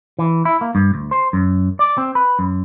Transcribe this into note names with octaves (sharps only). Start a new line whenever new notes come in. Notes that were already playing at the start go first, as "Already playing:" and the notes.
E3
E4
A#3
G2
D2
C5
F#2
D5
C4
B4
F#2